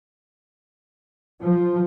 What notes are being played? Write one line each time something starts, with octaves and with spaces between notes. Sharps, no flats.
F3